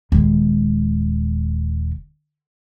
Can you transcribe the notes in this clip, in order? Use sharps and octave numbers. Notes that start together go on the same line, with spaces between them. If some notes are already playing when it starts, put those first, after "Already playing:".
D#1 G#3